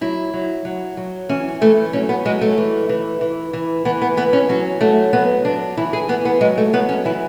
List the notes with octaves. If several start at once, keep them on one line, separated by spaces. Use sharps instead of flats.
F#3 E4
F#3
F#3
F#3
E3 C#4
E3 A3
F#3 C#4
B3
F#3 G#3
A3
E3
E3
E3
E3
E3 B3
B3
E3 B3
C#4
F#3 C#4
F#3 A3
F#3 B3
F#3 D4
E3 E4
G#4
E3 B3
B3
F#3 G#3
A3
F#3 B3
C#4
E3 E4